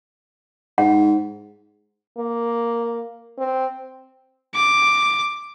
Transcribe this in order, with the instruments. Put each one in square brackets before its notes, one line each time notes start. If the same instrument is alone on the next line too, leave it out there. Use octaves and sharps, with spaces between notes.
[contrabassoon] G#2 [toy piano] F#5
[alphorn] A#3
C4
[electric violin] D6